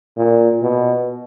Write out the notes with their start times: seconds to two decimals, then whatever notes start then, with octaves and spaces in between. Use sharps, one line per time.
0.17 A#2
0.62 B2